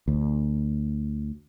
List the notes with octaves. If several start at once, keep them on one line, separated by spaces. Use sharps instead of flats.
D2